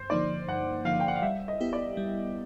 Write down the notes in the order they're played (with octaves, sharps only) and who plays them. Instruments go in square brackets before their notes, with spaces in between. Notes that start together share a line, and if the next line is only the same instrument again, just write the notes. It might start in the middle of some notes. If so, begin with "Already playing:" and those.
Already playing: [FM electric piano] G2 [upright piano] C5
[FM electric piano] D3 F3 A#3 D#4 [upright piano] D5
[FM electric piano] G2 [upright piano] F#5
[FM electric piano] D3 F3 A#3 D#4 [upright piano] F5
[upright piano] G5
F#5
F5
[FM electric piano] G3 [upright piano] E5
[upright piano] D#5
[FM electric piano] B3 E4 G4
[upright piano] D5
[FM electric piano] G3